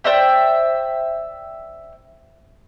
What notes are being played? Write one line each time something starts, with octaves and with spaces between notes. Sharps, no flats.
C5 D5 E5 G5